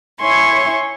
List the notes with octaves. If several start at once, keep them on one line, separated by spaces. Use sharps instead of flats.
E4 C#5 G#5 C6 C#6